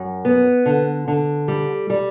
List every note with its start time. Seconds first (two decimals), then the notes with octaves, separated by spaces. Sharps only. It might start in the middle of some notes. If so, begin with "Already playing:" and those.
Already playing: F#2
0.25 B3
0.66 D3
1.08 D3
1.48 G3
1.90 G3